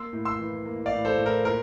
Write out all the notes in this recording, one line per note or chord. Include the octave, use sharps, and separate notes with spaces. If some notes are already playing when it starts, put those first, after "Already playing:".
Already playing: A#3 C6 E6
A2
C6 E6
E3
A#3
D5 F5
A2
A4 C5
A2
A#4
A#2 A#4